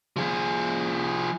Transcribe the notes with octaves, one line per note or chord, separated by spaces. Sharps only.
F3 G#4